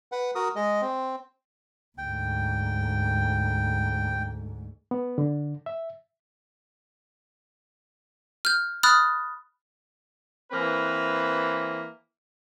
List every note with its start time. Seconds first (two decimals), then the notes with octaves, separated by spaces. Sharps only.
0.12 B4 F#5
0.35 F#4 A#4 D#6
0.56 G#3 D#5
0.82 C4
1.98 D2 G#2 G5
4.91 B3
5.18 D3
5.66 E5
8.45 F6 G6
8.83 B5 D#6 F6 F#6 A6
10.52 E3 A#3 C4 B4